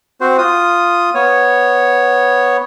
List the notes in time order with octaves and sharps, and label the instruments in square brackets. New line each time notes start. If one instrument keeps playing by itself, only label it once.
[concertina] C4 F#4 C5
F4 D#6
B3 C#5